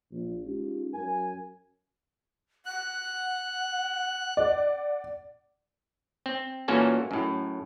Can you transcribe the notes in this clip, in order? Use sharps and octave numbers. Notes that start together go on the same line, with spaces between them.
A#1
G#3 C#4 D#4 F4 G4
F#2 A#4 G#5
F#5 F#6
D5
C4
A#2 E3 A#3 C#4 F#4 A4
F#2 A2